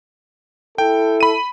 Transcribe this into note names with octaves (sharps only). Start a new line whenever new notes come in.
E4 A4 G5
B5 D#7